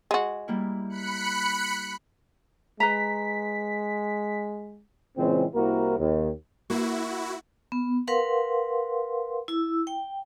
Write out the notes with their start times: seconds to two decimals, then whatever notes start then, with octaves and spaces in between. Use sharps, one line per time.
0.11 G#3 F#4
0.48 G3 A#3 E4
0.89 B5 F#6 C#7
2.80 G#3 B4 A#5 B6
5.17 A#2 C#3 E3 G#3 C4
5.54 C2 A#3 C4 E4 F#4 A#4
5.98 D#2
6.70 A#3 E4 F#4
7.72 B3
8.08 A#4 B4 F5 F#5 C6
9.48 E4 E6
9.87 G5